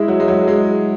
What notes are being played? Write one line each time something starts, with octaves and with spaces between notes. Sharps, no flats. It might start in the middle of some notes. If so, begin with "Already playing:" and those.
Already playing: G#3 E4
F#3
G#3
F#3
G#3